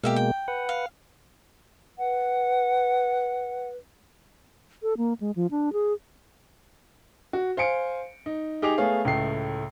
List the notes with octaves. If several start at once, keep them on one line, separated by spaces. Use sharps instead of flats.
B2 G#3 A#3 G4 E5 F5
G5
B4 F#5
F5
B4 F#5
A4
A#3
G#3
F3
D4
G#4
F#4
C5 F5 G#5 C#7 D7
D#4
D#4 G4 G#4 D6 F7
A3 B3 G#4 C#5 F5
C#2 A2 A3 C7